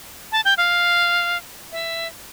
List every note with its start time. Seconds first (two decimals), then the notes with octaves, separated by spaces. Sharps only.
0.32 A5
0.45 G5
0.57 F5
1.72 E5